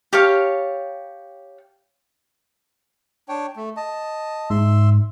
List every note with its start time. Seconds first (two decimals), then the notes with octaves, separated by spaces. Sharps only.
0.13 G4 C#5 F5 A5
3.29 D4 C#5 G5
3.56 A3
3.77 D#5 A5
4.50 G#2 E5 C6 E6